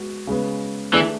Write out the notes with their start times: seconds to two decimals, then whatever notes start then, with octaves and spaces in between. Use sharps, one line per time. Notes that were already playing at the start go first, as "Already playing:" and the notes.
Already playing: G#3 B3 F#4
0.27 C#3 G#3 B3
0.94 E3 A3 D4 G#4 D5